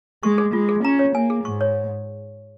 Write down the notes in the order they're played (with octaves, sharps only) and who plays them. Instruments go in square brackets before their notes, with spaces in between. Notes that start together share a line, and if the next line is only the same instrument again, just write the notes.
[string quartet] G#3 [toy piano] C#6
[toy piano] G#4
[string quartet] G#3 [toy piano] F4
[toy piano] G#4
[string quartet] C#4 [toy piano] A#5
[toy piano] C#5
[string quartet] A#3 [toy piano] G#5
[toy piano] G#4
[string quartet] G#2 [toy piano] C#6
[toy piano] C#5